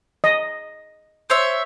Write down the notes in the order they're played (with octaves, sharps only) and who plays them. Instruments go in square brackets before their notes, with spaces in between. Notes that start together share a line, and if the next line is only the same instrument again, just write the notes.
[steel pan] D#5
[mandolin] C5 C#5 E5